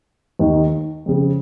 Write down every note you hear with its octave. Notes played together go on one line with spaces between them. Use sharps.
D#2 D#3
F2 C#3